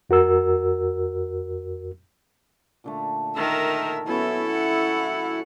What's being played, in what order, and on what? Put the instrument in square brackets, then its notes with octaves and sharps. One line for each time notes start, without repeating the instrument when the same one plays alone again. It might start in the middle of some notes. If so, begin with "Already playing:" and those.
[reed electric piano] F2 F#4 A#4 E6
[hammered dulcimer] A#2 D3 A3
[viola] D#3 A#4 [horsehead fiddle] E5
[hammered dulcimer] F#3 C#4 F#4 [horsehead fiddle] B3 [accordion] E4 [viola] A4
[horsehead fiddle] F#5